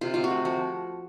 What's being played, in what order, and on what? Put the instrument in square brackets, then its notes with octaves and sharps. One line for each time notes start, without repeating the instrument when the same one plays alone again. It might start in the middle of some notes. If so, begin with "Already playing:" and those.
[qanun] C3 F4
C3 F4
F#4
A3
F3 F#4